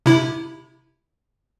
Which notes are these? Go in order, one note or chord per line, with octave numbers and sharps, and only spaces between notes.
C3 E4